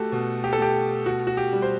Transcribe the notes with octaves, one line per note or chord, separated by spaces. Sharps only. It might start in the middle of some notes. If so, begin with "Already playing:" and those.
Already playing: A3 F#4 G4 A4
B2
G4
A4
A3 G4
B2 F#4
F#4
G4
G3
C5